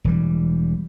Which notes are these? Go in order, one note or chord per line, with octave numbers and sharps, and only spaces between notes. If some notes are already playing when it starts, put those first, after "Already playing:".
E1 E3 G3